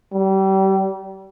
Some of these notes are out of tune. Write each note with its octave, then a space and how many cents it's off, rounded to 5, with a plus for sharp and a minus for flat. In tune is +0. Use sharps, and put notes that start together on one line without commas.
G3 -30